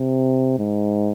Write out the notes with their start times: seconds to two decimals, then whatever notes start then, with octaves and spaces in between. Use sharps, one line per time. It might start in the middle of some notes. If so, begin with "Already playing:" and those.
Already playing: C3
0.59 G#2